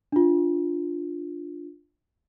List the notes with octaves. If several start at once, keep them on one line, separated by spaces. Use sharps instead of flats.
D4 F4